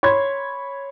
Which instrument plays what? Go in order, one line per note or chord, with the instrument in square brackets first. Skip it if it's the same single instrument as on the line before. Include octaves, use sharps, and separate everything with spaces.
[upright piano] C#5 B5 C6 G#6